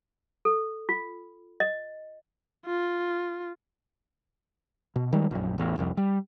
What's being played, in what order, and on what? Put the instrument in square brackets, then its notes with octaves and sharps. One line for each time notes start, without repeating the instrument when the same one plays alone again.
[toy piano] A4
F4
D#5
[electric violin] F4
[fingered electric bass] B2
D#3 G3 G#3
A#1 F#2
A1 E2
F1 C2 F2
G3